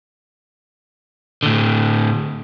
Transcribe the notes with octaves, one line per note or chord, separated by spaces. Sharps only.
A2 D3